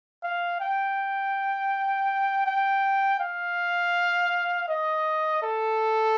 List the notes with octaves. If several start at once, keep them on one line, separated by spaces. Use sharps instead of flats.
F5
G5
G5
F5
D#5
A4